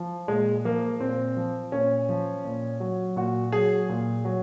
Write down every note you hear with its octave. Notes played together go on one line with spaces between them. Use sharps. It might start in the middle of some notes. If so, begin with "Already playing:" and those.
Already playing: F3
A#2 G#3
F3 A#3
A#2 C4
F3
A#2 C#4
F3
A#2
F#3
A#2 F#4
F#3 G#4
A#2
F#3